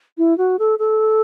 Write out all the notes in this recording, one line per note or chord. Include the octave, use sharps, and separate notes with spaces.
E4
F#4
A4
A4